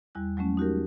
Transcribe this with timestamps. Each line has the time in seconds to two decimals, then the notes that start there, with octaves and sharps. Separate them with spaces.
0.15 E2 G3 E4 F#6
0.37 F#3 G#3 A3 C#4
0.57 D#4 F#4 G4 A#4